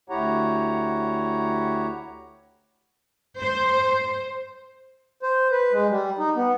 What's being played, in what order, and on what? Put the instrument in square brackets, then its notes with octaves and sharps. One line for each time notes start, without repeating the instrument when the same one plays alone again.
[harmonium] D2 E4 G4 C#5 F#5 A#5
[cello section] C5
[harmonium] C5
B4
G#3
G3
D#4
B3